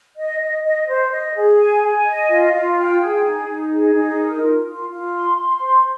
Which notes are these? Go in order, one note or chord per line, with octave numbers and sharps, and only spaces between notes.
D#5
D#5
D#5
C5
D#5
G#4
G#5
G#5
D#5
F4
F4
G5
G#4
D#4
D#4
G#4
D#4
A#4
F4
F4
F4
C6
C6
C5